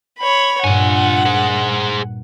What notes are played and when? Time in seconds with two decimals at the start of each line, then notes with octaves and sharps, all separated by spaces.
0.19 C#5 B5
0.64 G2 A#2 F4 F#5 G#5
1.26 G#4 C5